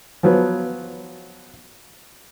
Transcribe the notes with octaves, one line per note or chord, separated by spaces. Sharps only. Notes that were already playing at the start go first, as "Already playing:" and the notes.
F3 F#3 B3